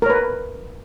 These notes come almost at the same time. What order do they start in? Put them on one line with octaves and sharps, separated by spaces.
A#4 C#5 B4